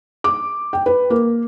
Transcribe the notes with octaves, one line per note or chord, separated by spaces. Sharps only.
D6
G5
B4
A#3